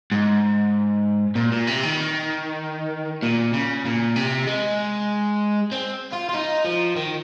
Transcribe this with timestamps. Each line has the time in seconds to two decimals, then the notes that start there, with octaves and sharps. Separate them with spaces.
0.12 G#2
1.35 A#2
1.52 A#2
1.67 C3
1.83 D#3
3.23 A#2
3.54 C#3
3.85 A#2
4.16 C3
4.47 G#3
5.72 C4
6.13 F4
6.29 F4
6.34 D#4
6.65 F3
6.96 D#3